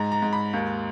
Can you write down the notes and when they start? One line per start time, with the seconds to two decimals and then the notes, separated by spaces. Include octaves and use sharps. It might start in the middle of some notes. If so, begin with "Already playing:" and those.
Already playing: G#2 A#5
0.12 A#5
0.22 G#2
0.33 B5
0.53 D#2